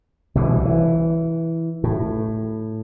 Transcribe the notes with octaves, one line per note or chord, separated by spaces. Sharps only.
C2 B2 D3 E3
E3
A2